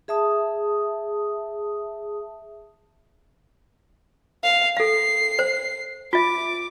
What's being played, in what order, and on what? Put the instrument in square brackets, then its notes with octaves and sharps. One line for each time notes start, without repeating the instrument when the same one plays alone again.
[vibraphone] G#4 E5 A5 D#6
[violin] F5
[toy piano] A4 F5 [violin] C7
[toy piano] C5
[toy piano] F4 E5 [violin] D6